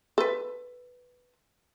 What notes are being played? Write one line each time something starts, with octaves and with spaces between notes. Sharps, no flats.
A4 B4